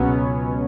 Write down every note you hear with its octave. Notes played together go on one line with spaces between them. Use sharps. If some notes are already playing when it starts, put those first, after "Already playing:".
Already playing: C#2 B2 F#3 B3 C#4